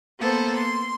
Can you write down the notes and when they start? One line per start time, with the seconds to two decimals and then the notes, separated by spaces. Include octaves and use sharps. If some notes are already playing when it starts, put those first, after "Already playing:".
0.20 A#3 B3 A4 C5
0.56 C6